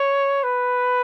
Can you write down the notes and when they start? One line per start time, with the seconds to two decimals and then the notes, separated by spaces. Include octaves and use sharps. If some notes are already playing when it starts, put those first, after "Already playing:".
Already playing: C#5
0.43 B4